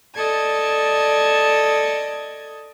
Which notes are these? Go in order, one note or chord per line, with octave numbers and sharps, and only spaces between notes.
A4 D5 D#5 A5 G#6